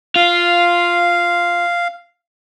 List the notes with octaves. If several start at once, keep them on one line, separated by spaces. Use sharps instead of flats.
F4 F5